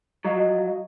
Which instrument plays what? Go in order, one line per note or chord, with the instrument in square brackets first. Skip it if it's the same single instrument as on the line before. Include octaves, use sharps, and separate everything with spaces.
[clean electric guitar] F3 F#3 [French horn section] D#5